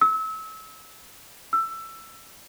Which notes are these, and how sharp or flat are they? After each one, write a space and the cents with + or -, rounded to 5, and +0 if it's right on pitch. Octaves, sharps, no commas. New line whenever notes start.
E6 -30
E6 +15